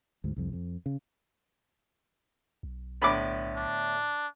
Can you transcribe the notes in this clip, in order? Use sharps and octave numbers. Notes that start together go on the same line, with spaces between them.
D2 G#2
C2 F2
F2
C#3
B1
A2 D3 B3 B5 D6
D4